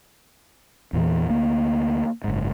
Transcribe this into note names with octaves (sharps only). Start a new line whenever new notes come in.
E2 A#2 E3
D2 A#3
F#1 G#2